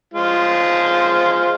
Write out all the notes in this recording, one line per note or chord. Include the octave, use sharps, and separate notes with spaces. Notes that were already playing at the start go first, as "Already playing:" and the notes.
G#3 F4 C5